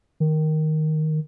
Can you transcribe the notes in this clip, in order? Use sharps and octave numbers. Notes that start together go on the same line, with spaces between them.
D#3